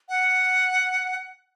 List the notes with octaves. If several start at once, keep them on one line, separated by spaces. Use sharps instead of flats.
F#5